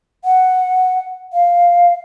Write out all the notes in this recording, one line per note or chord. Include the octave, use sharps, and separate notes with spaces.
F#5
F5